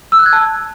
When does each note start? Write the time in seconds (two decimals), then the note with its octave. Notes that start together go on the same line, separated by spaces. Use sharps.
0.12 E6
0.19 F#6
0.26 G#6
0.33 A5